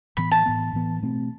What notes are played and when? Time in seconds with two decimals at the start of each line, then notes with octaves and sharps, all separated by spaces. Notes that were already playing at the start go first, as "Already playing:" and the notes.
0.17 A2 E3 B3 B5
0.32 A5
0.46 A2 E3 B3
0.73 A2 E3 B3
1.03 B2 A3 C4